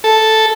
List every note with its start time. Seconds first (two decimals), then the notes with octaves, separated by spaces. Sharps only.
0.04 A4